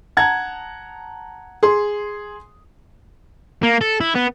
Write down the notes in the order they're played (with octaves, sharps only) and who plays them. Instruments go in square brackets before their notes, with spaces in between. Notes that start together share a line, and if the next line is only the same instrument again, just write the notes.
[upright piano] F#5 A5 A#5 G#6
G#4 C6
[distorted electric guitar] A#3
A4
E4
B3